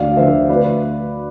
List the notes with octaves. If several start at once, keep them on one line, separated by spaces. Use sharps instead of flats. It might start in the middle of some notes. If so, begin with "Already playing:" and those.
Already playing: D2 D5 F5
D3 F3 A3 C5 E5
D2 B4 D5